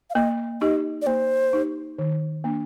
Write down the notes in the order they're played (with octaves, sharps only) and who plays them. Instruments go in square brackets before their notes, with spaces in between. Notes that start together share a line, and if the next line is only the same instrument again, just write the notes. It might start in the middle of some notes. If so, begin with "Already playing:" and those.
[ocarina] F5
[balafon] A#3 [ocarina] D#5
[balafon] D#4 G4 [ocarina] D#5
[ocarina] D5
[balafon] A#3 [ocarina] C5
[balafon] D#4 G4
D#3
A#3 D4